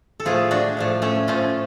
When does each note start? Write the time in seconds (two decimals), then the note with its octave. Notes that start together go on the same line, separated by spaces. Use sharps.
0.20 A4
0.25 A2 F3 A3 F4 G#4
0.51 D4 F#4
0.77 A2 F3 A3
1.02 A3 C#4
1.27 A2 F3 A3 C#4 F4